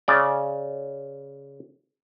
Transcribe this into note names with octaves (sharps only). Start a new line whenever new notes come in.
C#3 D5